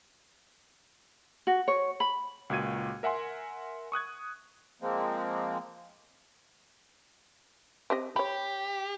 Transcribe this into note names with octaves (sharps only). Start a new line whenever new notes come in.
F#4
C#5
B5
C#2 A#2 F#4 G#6 D#7
A#4 E5 F#5 G#5 C6
C#6 D#6 F#6 G#6
F3 G#3 A#3 C4
C4 G4 D#5
G4 C#5 B5